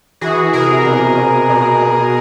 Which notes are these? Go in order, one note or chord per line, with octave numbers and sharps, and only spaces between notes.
E3 F#4 G#4
C3 G#4 A#4
B2
B2
B2
B2